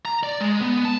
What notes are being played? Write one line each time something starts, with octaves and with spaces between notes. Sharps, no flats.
A#5
D5
G#3
B3
A5